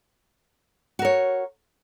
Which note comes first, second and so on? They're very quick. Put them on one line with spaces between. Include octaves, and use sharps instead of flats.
F#4 A#4 C#5